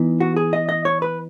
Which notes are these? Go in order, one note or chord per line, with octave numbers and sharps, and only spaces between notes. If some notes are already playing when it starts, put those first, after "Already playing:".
Already playing: E3 B3 D#4
F#4
G#4
D#5
D#5
C#5
B4